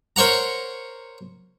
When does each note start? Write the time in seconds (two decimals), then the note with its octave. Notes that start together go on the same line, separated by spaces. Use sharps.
0.16 A#4 C5 C#5 F#5 A#5